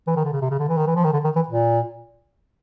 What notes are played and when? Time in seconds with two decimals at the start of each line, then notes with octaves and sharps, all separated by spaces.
0.07 E3
0.16 D#3
0.24 D3
0.33 C#3
0.41 C3
0.50 C#3
0.59 D3
0.69 E3
0.77 D#3
0.87 E3
0.96 F3
1.04 D#3
1.13 D3
1.24 D#3
1.36 E3
1.48 A#2